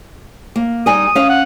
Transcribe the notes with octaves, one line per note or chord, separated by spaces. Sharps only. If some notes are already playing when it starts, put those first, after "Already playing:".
A#3
G3 D#4 G#5 D#6
C#4 F5
F#5